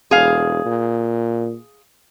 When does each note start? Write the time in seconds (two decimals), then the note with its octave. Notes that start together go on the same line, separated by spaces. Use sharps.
0.11 E1 G#4 F5
0.65 A#2